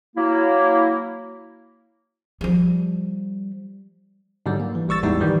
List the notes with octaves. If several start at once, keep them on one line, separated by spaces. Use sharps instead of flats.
F#3 A#3 E4
F3 G3
G#2 D3 F#3 G3
A#3
E3
A1 G3 C#6 E6 A6
E2 A2 G3 G#3 D#4 E4
F#2 D#3 E3 G3